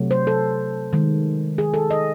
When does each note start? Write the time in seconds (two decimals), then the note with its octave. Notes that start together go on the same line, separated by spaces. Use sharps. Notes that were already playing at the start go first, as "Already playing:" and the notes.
Already playing: C3 F#3 A3
0.11 C5
0.27 A4
0.93 D#3 G#3
1.58 G#4
1.74 A4
1.90 D#5